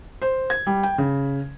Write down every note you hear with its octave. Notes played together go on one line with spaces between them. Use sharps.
C5
G#6
G3
G5
C#3